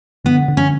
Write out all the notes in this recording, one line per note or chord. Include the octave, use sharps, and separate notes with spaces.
D3 B3
D3
C#4